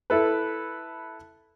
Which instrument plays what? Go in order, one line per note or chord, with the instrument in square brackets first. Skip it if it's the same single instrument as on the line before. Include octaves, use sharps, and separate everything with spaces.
[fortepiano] E4 A4 B4